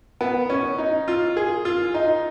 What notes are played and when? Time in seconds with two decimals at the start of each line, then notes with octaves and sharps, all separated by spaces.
0.21 B3
0.50 C#4
0.78 D#4
1.08 F4
1.37 G#4
1.65 F4
1.94 D#4